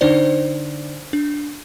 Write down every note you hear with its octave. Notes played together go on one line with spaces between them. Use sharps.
D3 D4 D#4 C5 D5
D4